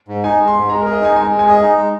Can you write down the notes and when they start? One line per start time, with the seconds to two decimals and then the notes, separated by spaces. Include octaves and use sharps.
0.08 G#2
0.24 D#4 G#5
0.39 G#3
0.47 C6
0.54 G#2
0.69 G#3 A#5
0.81 A#4
0.85 G#4
0.93 D#5
1.01 D#4 G#5
1.16 G#3 G#5
1.31 G#3
1.39 G#5
1.47 G#4 D#5
1.63 D#4
1.77 G#3